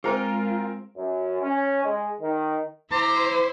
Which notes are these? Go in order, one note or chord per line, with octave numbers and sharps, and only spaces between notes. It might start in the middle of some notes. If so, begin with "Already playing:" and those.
G#3 C4 F4 G#4 A#4 C5
F#2
C#4
G#3
D#3
E4 C5 A#5 D6 C7